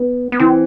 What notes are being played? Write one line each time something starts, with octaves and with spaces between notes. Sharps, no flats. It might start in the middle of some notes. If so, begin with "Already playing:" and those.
Already playing: B3
B3
E3 C4